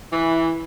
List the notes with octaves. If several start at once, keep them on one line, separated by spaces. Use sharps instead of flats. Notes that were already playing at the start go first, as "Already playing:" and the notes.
E3